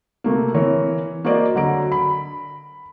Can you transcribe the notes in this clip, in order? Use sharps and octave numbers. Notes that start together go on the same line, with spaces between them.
C3 A3 A#3
E3 A#4 C#5
A#3 F#4 A#4 C5 D5 D#5
D3 F#3 A#5 D7
B5